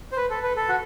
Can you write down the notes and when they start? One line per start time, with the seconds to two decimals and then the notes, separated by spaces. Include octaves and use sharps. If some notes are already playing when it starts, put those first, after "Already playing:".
0.12 C5
0.17 B4
0.30 A4
0.43 B4
0.56 A4
0.69 F#4